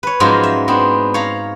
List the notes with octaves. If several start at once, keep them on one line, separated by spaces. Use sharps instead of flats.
B4 C#5
G#2 F3 F#3 G#3 C#4 F4
E5
B3 C4 D4
C#5 F5 A#5 B5